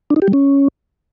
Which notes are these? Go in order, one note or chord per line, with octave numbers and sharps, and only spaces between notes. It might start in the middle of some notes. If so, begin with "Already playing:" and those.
D4
D#4
G4
G3
C#4